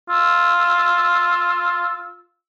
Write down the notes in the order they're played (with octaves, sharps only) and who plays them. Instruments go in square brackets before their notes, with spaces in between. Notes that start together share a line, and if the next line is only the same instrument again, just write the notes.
[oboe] F4 [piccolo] E6